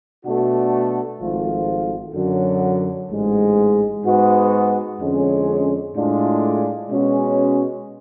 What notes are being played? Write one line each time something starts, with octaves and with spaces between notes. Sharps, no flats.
B2 A3 D4 F#4
G#1 G#2 F3 A3 F4
F#2 D3 F#3
A1 G#2 G#3
G#2 G#3 B3 F#4
F2 D3 G#3 C#4
A2 G#3 D4 F4
B2 G#3 C#4 F#4